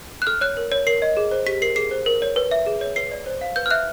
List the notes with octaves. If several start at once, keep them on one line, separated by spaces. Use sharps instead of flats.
F#6
A4 F6
C#5 F#6
A#4
C#5
A#4 C7
D#5
G#4
C5
G4 B6
A#4 C7
G#4 C7
C5
A#4
C#5
B4
E5
G#4
C#5
B4 C7
D5
C5
F5
B4 G6
F6
E5 F#6